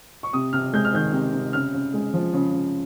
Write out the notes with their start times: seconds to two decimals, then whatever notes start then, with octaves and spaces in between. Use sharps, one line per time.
0.23 C#6
0.33 C3 D#6
0.53 C3 F6
0.73 G#3 G6
0.85 F6
0.94 D#3 G6
1.13 C3
1.33 C3
1.53 C#3 F6
1.74 C#3
1.94 G#3
2.14 F3
2.33 C#3
2.53 C#3